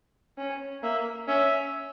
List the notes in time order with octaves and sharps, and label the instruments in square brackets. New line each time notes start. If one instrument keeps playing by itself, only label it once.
[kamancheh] C#4
[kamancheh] A#3 [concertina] E5
[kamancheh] C#4 [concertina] E5